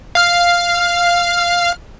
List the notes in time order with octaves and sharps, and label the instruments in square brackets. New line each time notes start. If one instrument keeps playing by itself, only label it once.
[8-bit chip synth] F5 F6